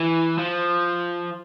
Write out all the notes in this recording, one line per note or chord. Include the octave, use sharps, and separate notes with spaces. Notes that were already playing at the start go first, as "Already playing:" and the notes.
Already playing: E3
F3